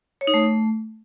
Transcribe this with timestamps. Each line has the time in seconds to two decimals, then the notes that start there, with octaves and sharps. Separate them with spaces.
0.21 C#5
0.27 D#4
0.34 A3